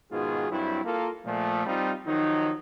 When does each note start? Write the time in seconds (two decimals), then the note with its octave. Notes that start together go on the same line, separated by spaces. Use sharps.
0.12 G#2 B2 D#3 F4 F#4 G#4
0.50 G2 F#3 C4 E4
0.85 A#3 F4 A4 A#4
1.26 A#2 F3 A3
1.66 G3 C4 D#4 F4
2.07 D#3 F3 F#3 D#4